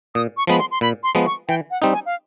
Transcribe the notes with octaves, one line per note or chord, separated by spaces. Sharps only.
A#2 D#6
C#6
F3 G#3 B3 B5
C6
C6
A#2 B5
C6
F3 G#3 B3
C#6
E3 G5
F#5
G3 C4 D#4
G#5
F5